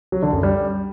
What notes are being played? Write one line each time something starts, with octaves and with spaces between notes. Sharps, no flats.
F#3
D3
F#2
G3